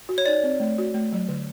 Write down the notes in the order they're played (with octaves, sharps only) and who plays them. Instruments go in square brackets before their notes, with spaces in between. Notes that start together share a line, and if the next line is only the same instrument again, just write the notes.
[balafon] F#4
[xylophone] C#5
[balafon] D#4 [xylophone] D5
[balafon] C4
A3
F#4
A3
F#3
D3